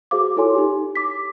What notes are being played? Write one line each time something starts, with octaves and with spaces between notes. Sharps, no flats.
F#4 G#4 C5 F5 D6
E4 F4 A4 C#5 G#5 C6
D#4 G4
D6 B6